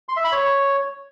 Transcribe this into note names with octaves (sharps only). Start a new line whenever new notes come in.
C6
E5
B5
C#5